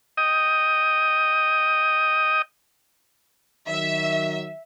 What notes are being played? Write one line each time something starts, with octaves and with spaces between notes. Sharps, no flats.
D#5 G5 D#6
D#3 F#3 E5